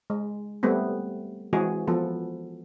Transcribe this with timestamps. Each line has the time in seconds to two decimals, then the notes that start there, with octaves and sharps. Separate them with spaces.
0.10 G#3
0.63 G3 A3 B3 C4
1.53 E3 G#3 C4 F#4 G#4
1.87 F3 B3 A4